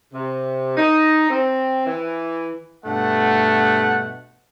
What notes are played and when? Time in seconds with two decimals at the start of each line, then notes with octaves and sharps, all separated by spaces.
0.13 C3
0.77 D#4
1.30 C4
1.86 E3
2.84 G2 B2 A3 F#5